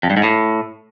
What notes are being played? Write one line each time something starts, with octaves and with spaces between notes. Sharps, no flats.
F2
G2
G#2
A2